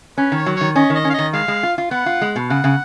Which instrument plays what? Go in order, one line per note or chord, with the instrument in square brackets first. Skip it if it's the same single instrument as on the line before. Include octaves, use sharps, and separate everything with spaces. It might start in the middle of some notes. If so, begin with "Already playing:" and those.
[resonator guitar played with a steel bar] C#4 [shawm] B4
[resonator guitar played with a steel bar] D#3 [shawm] C#5
[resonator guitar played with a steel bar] F#3
[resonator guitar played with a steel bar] D#3 [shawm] C#5
[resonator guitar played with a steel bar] C#4 [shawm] D#5
[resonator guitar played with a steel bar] D#3
[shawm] D#5
[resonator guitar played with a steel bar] C#4
[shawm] F5
[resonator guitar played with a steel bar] D#3 [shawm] D#5
[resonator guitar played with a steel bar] G#3 [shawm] F5
[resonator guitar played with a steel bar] G#3
F4
F4
[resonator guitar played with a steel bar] B3 [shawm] F#5
[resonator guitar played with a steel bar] F4
G#3
B2
[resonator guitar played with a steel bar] C#3 [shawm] F#5
[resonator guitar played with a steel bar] C#3